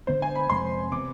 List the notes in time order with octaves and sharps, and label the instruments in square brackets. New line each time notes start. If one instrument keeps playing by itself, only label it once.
[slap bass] D3 G#3 B3 [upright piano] C5
[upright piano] G#5
B5
[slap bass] F2 C3 G#3 [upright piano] C6
[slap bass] C3 E3 B3 [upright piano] D6